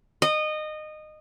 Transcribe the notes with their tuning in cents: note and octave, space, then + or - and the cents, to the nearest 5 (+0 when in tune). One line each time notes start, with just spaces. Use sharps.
D#5 -20